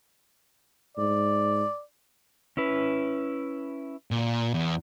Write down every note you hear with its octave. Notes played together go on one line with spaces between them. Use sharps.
G#2 D5
C#4 E4 B4
A#2
E2